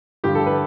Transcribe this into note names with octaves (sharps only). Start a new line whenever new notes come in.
G2 D3 F3 G4
A4
B4